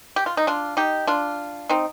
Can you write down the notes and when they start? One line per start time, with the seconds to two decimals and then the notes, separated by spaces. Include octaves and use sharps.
0.16 G4
0.26 F4
0.37 D#4
0.47 D4 F4
0.77 D#4 G4
1.07 D4 F4
1.69 C4 D#4